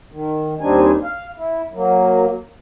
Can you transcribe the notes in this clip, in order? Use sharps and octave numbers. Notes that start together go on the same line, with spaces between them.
D#3
D#2 G3 C4 D4 D#4 G#5
F5
E4
F#3 A#3